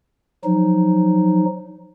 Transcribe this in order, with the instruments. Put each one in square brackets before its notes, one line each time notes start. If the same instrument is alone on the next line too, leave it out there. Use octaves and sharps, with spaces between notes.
[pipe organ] F3 F#3 D#4